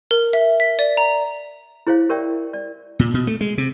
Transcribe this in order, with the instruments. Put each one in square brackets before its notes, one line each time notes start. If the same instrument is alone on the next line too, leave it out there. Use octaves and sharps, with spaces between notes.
[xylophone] A#4
E5
B6
D5
A#5
[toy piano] E4 G#4 C5 C#5 F5
G4 A#4 C#5 D5 E5 G5
D5
[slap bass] A#2
B2
A3
G#3
C3